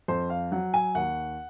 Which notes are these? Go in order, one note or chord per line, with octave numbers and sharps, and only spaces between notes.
F2 C5
F5
F#3 F#5
G#5
D#2 F#5